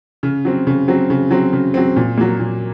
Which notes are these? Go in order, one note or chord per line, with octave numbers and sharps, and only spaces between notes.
C#3
F#3 C4
C#3
F#3 C4
C#3
F#3 C4
C#3
F#3 C4
A#2
F#3 A#3
A#2